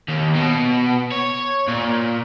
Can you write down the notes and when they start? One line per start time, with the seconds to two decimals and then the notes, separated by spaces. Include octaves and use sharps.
0.08 D#2
0.35 B2
1.12 C#5
1.68 A#2